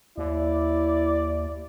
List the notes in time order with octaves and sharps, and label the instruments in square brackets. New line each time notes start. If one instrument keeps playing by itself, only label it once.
[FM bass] D#2 [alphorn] E4 [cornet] D5